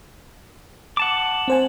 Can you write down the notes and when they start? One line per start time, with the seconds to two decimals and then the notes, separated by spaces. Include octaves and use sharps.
0.97 F#5 A5 D6
1.48 C4 C5 G#5